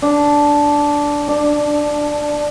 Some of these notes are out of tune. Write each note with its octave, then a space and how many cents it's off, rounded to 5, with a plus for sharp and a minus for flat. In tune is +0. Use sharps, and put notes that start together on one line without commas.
D4 -10
D4 +10